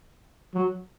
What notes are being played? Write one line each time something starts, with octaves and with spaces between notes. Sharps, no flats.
F#3